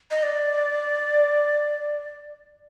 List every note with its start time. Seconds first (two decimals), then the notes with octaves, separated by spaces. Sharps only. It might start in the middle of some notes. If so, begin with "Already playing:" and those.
0.11 D#5
0.23 D5